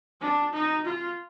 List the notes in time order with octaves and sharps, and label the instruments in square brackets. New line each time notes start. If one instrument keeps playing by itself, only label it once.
[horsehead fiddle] D4
D#4
F4